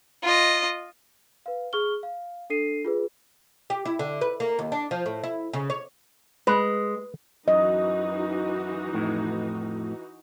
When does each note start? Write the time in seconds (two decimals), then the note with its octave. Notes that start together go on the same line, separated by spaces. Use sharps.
0.23 F4 D#5
1.46 B4 F5
1.73 G#4 C#6 F6 G7
2.03 F5
2.50 D4 A4 C7 D#7
2.85 F4 G#4 B4
3.70 G4
3.85 E4
3.99 D3
4.21 B4
4.40 A#3
4.59 D#2
4.72 D4
4.91 F3
5.06 A2
5.24 E4
5.53 C#3
5.70 C#5
6.47 G#3 B4
7.48 F#2 E3 D#4 F#4 D#5
8.93 F2 A2